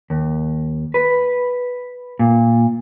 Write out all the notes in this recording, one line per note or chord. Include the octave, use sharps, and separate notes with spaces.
D#2
B4
A#2